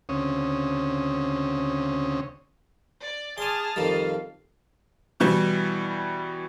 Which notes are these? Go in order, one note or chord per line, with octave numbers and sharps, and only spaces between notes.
D2 C#3 C4 C#4 C#5 D#6
D5
G#4 A5 C6 D6 D#6 F6
F2 D#3 G3 F5
B2 E3 G3